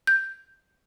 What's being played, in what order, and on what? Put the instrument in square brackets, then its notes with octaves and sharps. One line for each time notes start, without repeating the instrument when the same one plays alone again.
[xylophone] G6